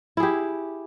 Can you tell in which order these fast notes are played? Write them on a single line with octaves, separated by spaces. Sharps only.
E4 G#4 G4